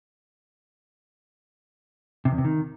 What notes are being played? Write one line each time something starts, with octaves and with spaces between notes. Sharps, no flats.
C3
E2
C3
D#3